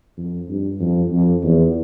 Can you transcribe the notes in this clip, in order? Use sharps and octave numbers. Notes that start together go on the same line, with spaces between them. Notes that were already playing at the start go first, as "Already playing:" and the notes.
F2
G2
F2
F2
E2